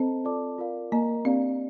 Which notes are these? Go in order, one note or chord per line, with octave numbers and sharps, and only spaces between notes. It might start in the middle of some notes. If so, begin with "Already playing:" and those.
Already playing: C4 A4 C5 D#5 A5
F4 A4 D5 A5 D6
F4 A#4 D5 F5
A#3 A#4 D#5 A#5
C4 D4 G4 D5 F5